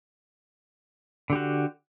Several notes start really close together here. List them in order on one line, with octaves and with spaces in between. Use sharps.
D3 G4 F#4